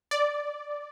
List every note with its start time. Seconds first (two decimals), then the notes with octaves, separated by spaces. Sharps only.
0.11 D5